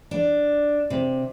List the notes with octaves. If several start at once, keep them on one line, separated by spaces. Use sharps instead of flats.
D4
C3